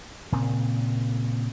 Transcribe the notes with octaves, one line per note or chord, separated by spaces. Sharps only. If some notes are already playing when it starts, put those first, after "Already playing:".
A#2 C#3 C4